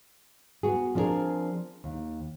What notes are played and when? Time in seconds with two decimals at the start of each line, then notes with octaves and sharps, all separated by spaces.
0.63 B3 F#4 G#4
0.95 F3 C4 D4 F#4 G#4 A#4
1.84 D#2